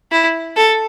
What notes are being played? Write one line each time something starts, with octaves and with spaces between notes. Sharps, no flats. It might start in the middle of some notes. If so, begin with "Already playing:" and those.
E4
A4